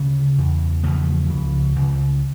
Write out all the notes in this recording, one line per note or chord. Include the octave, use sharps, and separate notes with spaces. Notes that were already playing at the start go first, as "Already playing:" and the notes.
Already playing: D2 C#3
E2 C#3
E2 C#3 F3 A3
C#3
C#2
C#2 C#3